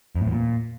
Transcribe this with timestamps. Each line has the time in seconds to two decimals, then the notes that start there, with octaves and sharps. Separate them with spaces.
0.16 F2
0.21 A2
0.27 E2
0.32 A#2